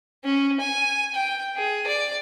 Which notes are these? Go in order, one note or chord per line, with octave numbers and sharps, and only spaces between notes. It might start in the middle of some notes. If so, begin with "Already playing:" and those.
C#4
G#5
G5
G#4
D5